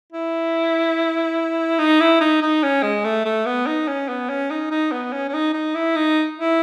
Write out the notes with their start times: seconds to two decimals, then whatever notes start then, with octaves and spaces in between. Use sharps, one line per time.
0.12 E4
1.79 D#4
2.00 E4
2.21 D#4
2.42 D#4
2.63 C#4
2.83 G#3
3.04 A3
3.25 A3
3.46 B3
3.67 D#4
3.88 C#4
4.09 B3
4.29 C#4
4.50 D#4
4.71 D#4
4.92 B3
5.13 C#4
5.28 C#4
5.33 D#4
5.54 D#4
5.75 E4
5.96 D#4
6.38 E4